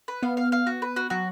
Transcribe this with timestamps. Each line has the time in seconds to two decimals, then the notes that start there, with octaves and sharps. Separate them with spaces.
0.08 B4
0.23 B3 F5
0.37 F5
0.52 F5
0.67 F#4
0.82 B4
0.96 F#4
1.10 F#3 F#4